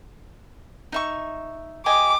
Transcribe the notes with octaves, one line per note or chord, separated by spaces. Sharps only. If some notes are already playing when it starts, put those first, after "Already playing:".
D#4 E5 C#6
G4 D#5 G#5 D6